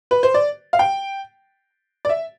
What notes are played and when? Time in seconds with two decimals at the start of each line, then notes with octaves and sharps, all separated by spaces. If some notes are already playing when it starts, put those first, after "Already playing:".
0.11 B4
0.23 C5
0.34 D5
0.73 F5
0.79 G5
2.05 D5
2.09 E5